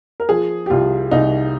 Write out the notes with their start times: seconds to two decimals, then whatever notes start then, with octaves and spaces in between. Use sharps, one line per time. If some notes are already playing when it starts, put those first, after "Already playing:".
0.20 A#4
0.29 F3 G#4
0.66 G4
0.70 C2 F4
1.11 C2 D#4